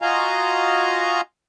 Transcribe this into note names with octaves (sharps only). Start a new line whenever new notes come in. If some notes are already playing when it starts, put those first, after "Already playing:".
F4 F#4 D#5 F5 G#5 A#5